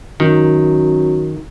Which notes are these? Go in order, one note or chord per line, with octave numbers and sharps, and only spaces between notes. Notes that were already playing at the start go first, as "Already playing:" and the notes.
F#2 D#3